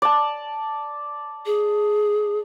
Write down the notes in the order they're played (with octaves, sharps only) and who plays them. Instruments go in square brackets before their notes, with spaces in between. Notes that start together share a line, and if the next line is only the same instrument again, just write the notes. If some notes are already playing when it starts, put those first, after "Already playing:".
[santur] D5 A5
[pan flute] G#4